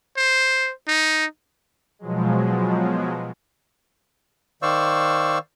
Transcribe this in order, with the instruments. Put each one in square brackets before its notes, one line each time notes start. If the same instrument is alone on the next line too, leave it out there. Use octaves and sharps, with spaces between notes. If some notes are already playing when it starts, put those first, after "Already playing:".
[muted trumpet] C5
D#4
[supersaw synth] B2 F3 F#3 G#3
[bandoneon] D#3 C5 D5 F5 C#6 E6